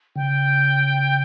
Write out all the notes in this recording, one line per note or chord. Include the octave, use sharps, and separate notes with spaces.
C#3 G5